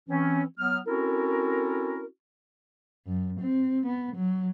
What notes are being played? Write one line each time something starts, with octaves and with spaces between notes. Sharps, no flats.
E3 C4 C#4
F#3 B3 F6
C4 C#4 E4 F#4 A4 A#4
F#2
C4
B3
F#3